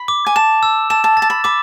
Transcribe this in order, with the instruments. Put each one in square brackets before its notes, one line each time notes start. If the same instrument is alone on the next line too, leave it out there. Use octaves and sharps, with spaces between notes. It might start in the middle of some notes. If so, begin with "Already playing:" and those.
Already playing: [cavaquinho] B5
[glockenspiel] D6
[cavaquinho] G#5
[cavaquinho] A5 [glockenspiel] E7
[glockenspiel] E6
[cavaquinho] A5 [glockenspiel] E7
[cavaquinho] A5
[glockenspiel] A6
[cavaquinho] A5
B5
[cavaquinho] B5 [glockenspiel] D6